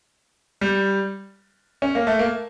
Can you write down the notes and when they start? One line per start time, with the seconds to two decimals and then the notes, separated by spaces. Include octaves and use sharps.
0.61 G3
1.82 C#4
1.95 A#3
2.07 A3
2.19 A#3